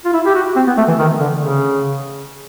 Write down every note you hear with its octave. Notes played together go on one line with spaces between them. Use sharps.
F4
E4
G4
F#4
C4
B3
A3
E3
D#3
D3
C#3